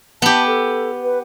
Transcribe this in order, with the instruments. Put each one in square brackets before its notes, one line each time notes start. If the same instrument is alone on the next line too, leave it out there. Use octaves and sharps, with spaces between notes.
[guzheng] B3 G4 [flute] A5
[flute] A4
B4